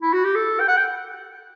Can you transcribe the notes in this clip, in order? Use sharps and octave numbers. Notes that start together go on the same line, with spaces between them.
E4
F#4
G4
A4
G5
F#5
G5